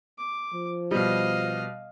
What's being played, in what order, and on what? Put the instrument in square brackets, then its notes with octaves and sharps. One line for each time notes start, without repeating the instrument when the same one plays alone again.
[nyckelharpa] D6
[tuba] F3
[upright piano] B2 G3 [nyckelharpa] D#5 F5